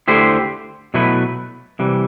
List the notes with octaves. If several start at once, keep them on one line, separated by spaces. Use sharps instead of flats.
D3 A3 E4 G4 C5
B2 F#3 A3 E4 B4
C3 E3 G3